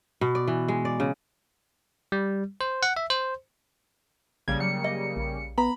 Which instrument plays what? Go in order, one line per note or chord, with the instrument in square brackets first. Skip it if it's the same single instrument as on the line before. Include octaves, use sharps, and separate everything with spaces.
[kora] B2
D5
E3
G#3
D5
C#3
[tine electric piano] G3
C5
F#5
E5
C5
[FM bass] A#1 [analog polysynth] C#3 G3 A#3 [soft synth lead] G#6
[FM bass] F#3 [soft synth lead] C#7
[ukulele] D#5
[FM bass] A#1
[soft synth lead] B3 [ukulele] A#5 [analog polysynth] B5